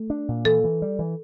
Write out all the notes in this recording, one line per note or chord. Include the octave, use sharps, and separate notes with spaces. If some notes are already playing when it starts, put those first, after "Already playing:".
Already playing: A3
D4
A#2
E3 A4
E3
G3
E3